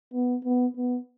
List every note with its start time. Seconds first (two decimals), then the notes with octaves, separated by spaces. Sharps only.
0.14 B3
0.44 B3
0.76 B3